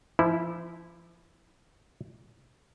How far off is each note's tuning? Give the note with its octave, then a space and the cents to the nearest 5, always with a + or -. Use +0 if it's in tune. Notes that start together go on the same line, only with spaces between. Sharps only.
F3 -40 E4 -10